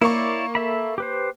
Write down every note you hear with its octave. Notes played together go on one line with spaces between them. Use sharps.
A#3 E4 C#5 D5 C#6
A4 E5 B5
G4 B4 C5